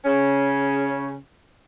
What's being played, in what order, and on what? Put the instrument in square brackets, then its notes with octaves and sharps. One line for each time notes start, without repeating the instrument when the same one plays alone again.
[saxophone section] C#3 C#4